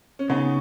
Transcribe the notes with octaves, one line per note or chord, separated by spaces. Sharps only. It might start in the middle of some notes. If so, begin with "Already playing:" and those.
C#4
C#3 B3 D#4